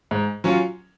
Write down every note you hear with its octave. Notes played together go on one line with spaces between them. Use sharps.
G#2
F#3 C#4 F4